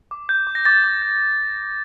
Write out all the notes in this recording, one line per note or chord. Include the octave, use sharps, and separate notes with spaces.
D6
G6
D6
A#6
D6 A6
D6
G6